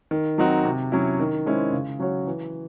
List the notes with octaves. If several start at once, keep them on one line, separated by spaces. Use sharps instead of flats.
D#3
F#3 C4 D#4 F#4
C3
F#3 C#4 E4
D#3
G#3 C#4 E4 C5
C#3
F#3 C#4 F#4 C#5
E3